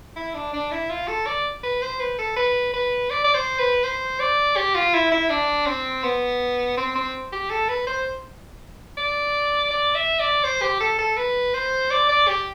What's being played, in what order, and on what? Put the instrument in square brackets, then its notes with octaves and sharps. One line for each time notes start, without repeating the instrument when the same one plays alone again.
[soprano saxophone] E4
D4
D4
E4
F4
A4
D5
B4
C5
B4
A4
B4
B4
D5
D5
C5
B4
C5
D5
G4
F4
E4
E4
D4
C4
B3
C4
C4
G4
A4
B4
C5
D5
D5
E5
D5
C5
G4
A4
A4
B4
C5
D5
D5
G4